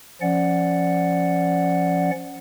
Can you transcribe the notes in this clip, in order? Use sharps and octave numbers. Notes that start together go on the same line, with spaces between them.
F3 C#4 D5 F#5